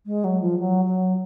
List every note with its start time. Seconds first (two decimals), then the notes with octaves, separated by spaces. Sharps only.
0.06 G#3
0.24 F#3
0.40 F3
0.59 F#3
0.85 F#3